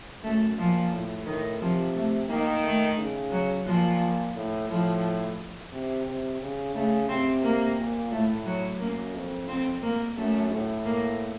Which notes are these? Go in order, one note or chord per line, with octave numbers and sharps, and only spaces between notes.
F#2 A3
A#2 F3
A2
A2 D#3
C3 F3
A3
D#3 A#3
A3
C#3
F#3
A#2 F3
A2
A2 F3
C3
C3
C#3
C#3 A3
C3 C4
A#3
A#2
A2 A3
F#3
F#2 A#3
F2
F2 C4
A#3
F#2 A3
A2
A#3